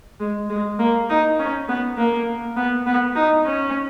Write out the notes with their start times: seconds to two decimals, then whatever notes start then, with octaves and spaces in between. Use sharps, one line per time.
0.20 G#3
0.50 G#3
0.79 A#3
1.10 D#4
1.39 C#4
1.69 B3
1.98 A#3
2.57 B3
2.86 B3
3.15 D#4
3.45 C#4